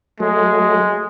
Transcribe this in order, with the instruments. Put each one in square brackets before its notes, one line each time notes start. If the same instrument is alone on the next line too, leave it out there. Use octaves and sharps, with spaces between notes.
[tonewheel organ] F#3 A3 [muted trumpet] G#3